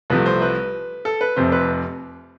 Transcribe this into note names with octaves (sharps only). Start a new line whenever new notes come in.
C2 C3 F3 A3 B4
C5
B4
A4
B4
F1 F2 C3 C5
B4